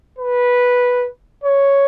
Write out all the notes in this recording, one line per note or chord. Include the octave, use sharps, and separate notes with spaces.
B4
C#5